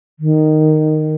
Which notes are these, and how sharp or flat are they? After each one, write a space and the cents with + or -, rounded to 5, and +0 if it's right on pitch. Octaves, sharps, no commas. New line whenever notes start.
D#3 -10